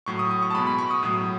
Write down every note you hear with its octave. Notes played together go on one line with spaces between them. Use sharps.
A2 F#3 C#6
D#6
D#6
C#6
A5
B2 G#3 B5
B5
C#6
D#6
A2 F#3 D#6